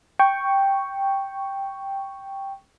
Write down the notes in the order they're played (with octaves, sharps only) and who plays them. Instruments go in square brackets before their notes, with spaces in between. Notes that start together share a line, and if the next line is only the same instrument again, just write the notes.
[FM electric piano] G5 C#6